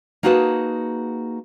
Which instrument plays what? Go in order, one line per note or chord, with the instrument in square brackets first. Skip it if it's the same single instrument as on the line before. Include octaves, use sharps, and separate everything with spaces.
[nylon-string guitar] A#3 D#4 F#4 G#4 B4 A5